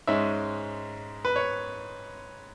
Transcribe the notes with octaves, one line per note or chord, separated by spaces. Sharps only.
G#2 G#3 C#4 E5
B4
C#5